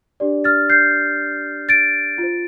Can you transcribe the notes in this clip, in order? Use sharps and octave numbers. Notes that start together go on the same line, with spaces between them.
D4 G4 D5
F6 A6
G6 C7
A6 D7
F4
C5